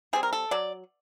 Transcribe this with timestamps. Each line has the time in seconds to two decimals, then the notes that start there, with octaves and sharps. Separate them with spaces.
0.13 G3 C4 G#4
0.23 A#4
0.33 A4
0.51 F#3 D5